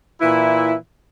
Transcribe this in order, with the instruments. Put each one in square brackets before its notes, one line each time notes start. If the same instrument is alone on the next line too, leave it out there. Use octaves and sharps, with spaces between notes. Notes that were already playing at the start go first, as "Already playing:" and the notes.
[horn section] A#2 E3 E4